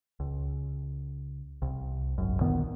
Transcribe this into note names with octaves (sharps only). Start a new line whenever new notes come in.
C#2
C2
G#1 F#2
D2 A#2 D#3 B3